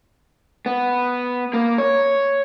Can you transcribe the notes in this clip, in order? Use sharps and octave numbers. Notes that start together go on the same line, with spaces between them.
B3
A#3
C#5